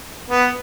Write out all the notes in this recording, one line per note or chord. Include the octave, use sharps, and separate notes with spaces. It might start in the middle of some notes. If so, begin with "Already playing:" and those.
B3